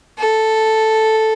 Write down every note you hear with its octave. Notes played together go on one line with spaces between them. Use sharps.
A4